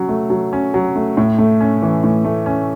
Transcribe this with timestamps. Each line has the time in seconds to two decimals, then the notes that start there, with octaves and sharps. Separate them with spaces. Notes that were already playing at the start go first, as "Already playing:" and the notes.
Already playing: F#3 C#4
0.09 A3
0.30 F#3
0.53 C#4
0.74 F#3
0.96 A3
1.17 A2
1.38 A3
1.60 C#4
1.82 E3
2.04 A2
2.24 A3
2.46 C#4